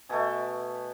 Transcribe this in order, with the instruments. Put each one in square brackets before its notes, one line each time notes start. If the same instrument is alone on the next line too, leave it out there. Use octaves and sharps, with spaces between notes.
[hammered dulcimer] B2 A3 G#5